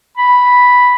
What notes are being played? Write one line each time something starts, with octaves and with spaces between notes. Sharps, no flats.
B5